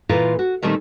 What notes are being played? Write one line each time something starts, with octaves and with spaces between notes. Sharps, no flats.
A#2 E3 E4 F4 A4 A#4
F#4
A#2 D#3 G3 A3 C4